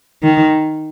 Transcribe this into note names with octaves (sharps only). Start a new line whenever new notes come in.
D#3